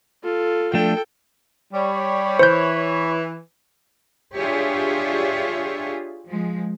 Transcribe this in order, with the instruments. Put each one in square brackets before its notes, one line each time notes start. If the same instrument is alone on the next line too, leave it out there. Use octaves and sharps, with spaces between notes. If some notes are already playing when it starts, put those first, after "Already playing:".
[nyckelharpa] F4 A4
[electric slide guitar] F3 A3 D4 [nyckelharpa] A4 G5
[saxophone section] G3 [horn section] C#5 B5
[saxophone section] E3 [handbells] C5 G6
[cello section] D4 F4 G4 G#4 C#5 E5
F3 G#3